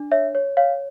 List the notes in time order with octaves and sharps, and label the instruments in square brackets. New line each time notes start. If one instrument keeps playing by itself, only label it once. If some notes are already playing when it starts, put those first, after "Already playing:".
Already playing: [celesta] D4
C#5 E5
C#5
C#5 F5